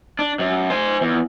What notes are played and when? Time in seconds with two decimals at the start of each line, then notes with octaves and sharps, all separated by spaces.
0.19 D4
0.39 F#2
0.70 C5 G#5
1.01 E2